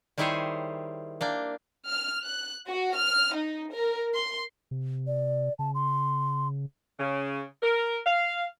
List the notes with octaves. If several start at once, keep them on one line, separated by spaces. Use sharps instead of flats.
D#3 G3 E4 G#4 C5 C#5
A#3 D4 G5
F6
F#6
F#4
F6
D#4
A#4
C6
C3
D5
C#3 A5
C6
C#3
A#4
F5